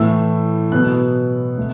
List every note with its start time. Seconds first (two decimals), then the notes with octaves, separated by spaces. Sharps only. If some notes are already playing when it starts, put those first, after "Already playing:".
Already playing: A2 E3 A3 E6
0.72 B2 F#3 B3 F#6
1.58 A3